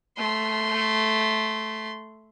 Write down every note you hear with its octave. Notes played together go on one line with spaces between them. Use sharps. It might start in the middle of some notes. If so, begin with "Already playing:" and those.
A3 C6